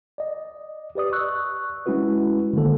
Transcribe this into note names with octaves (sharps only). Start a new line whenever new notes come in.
D5 D#5
G4 B4 D5 D#6
C#6 E6 F#6
G#3 C#4 E4 F#4 B4
D3 D#3 G#3 A#3 A4